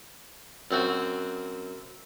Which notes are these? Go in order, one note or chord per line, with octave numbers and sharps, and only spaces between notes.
F#2 C4 F#4